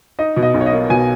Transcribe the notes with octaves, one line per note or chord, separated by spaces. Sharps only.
D#4 D#5
B2
D#5
B1
C#5
D#5
A#3
B2 G#5